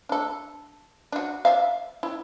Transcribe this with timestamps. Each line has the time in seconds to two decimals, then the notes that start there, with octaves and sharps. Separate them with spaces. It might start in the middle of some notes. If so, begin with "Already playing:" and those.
0.09 D4 A4
1.12 D4 F#4
1.45 D5 E5 F5
2.03 E4